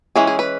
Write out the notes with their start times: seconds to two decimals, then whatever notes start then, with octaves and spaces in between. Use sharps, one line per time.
0.16 E3 G#3 C#4 G#4
0.27 G#4
0.39 B4